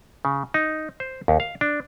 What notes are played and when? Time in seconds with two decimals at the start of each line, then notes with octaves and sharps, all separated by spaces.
0.25 C#3
0.54 D#4
1.00 C5
1.28 D#2
1.40 F5
1.61 D4